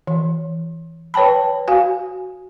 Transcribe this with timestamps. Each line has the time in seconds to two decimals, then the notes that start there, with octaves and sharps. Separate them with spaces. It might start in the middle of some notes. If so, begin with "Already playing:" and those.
0.07 E3
1.14 B4 C#5 G5 A5 B5
1.68 F#4 F5 G#5